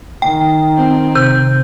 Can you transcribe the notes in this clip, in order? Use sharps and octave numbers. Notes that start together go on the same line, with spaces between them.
D#3 G5
C4
C3 G6